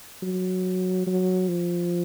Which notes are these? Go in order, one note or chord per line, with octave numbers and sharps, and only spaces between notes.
F#3
F#3
F3